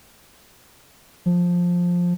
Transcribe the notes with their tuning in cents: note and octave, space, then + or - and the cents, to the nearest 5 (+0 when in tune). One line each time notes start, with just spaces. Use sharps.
F3 +10